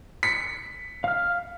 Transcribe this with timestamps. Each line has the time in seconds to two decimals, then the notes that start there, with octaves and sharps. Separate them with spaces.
0.23 B6 C#7
1.04 F5 F6